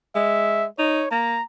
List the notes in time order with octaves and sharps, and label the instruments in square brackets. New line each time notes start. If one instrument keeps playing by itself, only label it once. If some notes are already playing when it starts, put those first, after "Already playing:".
[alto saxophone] G#3 [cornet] E5
[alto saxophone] D#4 [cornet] C#5
[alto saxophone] A#3 [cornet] A#5